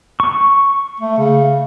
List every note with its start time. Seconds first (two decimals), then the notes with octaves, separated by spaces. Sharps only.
0.20 C#6
1.01 A3
1.18 C#3